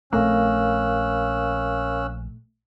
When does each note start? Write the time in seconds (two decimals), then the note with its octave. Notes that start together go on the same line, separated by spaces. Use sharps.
0.13 A#1 A3 C4 C#4 A#4 F5 E6 F#6